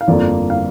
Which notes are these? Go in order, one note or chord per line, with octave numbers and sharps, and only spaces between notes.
F5
G1 F2 F3 A#3 D5
F5